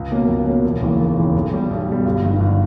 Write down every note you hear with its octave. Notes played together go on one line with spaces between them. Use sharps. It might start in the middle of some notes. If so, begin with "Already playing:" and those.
Already playing: C#2
B2 A#3 C#4
C#2
B2 A#3 C#4
E1
D#2 C#3 E3 A#3
E1
D#2 C#3 E3 A#3
B1
B2 G3
B1
B2 G3
G1
G2 D#3
G1